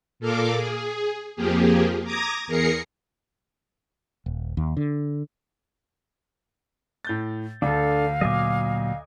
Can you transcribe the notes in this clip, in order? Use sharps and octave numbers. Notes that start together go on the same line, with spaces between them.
A#2 A4 A#4 F5 D6
G#4
F2 F3 A#3 G4 G#4
A#5 D6 D#6 G#6 A#6
E2 G#4 A#4 A#5 C7 C#7
D#1
D#2
D3
A2 G6 A6
D2 D4 A4 F5
A#2 F#3 D#5 G#5 D6